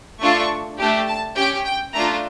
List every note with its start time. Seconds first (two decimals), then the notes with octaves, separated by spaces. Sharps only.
0.20 A3 D4 F4 A4 C#6
0.78 A3 D4 G4
1.07 A5
1.36 C#4 G4 G5
1.65 G5
1.94 A3 D4 F4 A#5